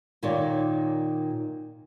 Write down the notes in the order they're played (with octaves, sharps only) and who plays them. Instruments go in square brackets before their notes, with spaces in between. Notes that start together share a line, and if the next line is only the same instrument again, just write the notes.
[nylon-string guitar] A#2 D#3 A#3 F4 C#5 D5